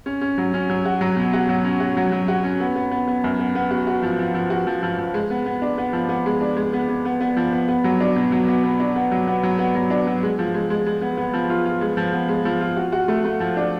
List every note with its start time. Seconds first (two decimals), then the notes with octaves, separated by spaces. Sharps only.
0.06 C#4
0.21 C#4
0.38 F#3
0.54 C#4
0.70 F#3
0.85 F#4
1.01 F#3
1.17 B2
1.33 F#4
1.49 F#3
1.64 C#4
1.80 F#4
1.97 F#3
2.12 F#3
2.28 F#4
2.44 C#4
2.60 B3
2.76 B3
2.91 B3
3.08 B3
3.24 F#2
3.39 B3
3.55 B3
3.71 F#4
3.87 F#4
4.02 F3
4.19 F3
4.34 F3
4.50 F#4
4.67 F3
4.83 F3
4.98 F3
5.14 G#3
5.30 B3
5.46 B3
5.62 D4
5.78 B3
5.93 F3
6.09 B3
6.26 G#3
6.41 D4
6.57 G#3
6.73 B3
6.88 B3
7.05 B3
7.20 B3
7.37 F3
7.53 B3
7.68 B3
7.84 F#3
8.00 D4
8.16 B2
8.32 F#3
8.48 B3
8.64 B3
8.80 D4
8.96 B3
9.11 F#3
9.27 B3
9.43 F#3
9.59 B3
9.75 F#3
9.90 D4
10.07 F#3
10.23 G#3
10.39 F3
10.54 G#3
10.70 G#3
10.86 G#3
11.01 B3
11.17 B3
11.33 F3
11.50 F4
11.65 F4
11.81 G#3
11.97 F3
12.13 B3
12.29 G#3
12.45 F3
12.61 F4
12.76 F#4
12.92 F#4
13.08 A3
13.24 A3
13.40 F3
13.57 D4